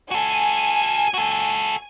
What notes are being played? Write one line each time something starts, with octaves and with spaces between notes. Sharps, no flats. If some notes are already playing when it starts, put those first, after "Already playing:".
F#4 A4 G#5
F#4 A4